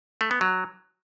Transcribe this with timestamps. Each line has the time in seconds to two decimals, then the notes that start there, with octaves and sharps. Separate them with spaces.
0.21 A3
0.31 B3
0.41 F#3